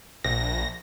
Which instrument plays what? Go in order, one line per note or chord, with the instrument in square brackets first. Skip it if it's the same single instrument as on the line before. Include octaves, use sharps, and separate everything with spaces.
[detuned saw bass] A#1 [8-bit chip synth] A#6